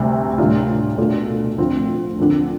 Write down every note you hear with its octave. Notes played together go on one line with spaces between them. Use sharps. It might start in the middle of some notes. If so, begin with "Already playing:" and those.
Already playing: D2 C3 G3
A2 G3 D4 F4
B2 A3 D4 F4
D2 D3 F3 C4 F4
D3 F3 C4